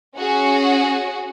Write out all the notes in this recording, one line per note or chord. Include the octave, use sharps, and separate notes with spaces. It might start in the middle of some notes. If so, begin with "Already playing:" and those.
C#4 F#4 G#4